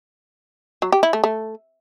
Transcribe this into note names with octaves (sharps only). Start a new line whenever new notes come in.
F#3
G4
E4
A3
A3